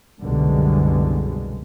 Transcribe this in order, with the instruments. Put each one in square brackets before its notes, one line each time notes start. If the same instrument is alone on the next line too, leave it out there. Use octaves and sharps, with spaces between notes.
[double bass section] C2 F#2 B2 D3 G3 G#3